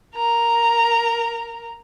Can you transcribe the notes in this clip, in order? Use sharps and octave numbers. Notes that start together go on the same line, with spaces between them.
A#4 A#5